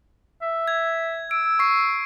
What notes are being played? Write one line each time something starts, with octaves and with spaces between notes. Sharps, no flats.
E5
G#6
E6 D7
C#6 C7